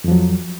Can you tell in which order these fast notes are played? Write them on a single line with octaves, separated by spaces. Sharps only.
F2 F3 F#3